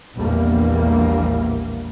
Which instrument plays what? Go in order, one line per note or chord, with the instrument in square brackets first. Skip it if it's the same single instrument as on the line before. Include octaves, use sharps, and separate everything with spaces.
[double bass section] A#1 E2 G3 A#3